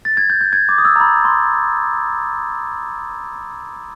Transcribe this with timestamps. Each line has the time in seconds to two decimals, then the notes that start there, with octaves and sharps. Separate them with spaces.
0.05 A6
0.17 G#6
0.30 G6
0.41 G6
0.53 G#6
0.69 D6
0.78 D#6
0.85 E6
0.96 A#5
1.00 B5
1.25 C6